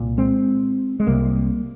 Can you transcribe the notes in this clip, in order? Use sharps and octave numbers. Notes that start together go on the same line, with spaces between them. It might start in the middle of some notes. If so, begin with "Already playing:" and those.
Already playing: C2 A#2
G#3 C4
G#3
C2 C3 G3 A#3